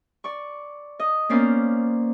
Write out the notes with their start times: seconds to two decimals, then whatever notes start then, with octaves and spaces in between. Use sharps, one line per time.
0.24 D5 C#6
1.00 D#5
1.29 A#3 B3 C#4 C5 D5 F5